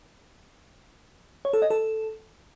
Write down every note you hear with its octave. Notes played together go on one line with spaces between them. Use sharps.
C#5
A4
D#5
A4